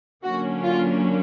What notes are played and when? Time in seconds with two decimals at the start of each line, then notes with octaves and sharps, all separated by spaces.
0.24 D3 F#3 A#3 C#4 F#4
0.64 F4